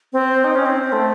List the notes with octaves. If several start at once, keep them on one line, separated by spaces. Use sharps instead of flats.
C4
D#4
C#4
C4
A3